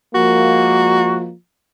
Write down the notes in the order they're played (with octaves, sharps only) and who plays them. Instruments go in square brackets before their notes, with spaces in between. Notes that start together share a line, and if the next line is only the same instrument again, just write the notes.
[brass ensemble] F3 G#3 A#3 [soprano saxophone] F#4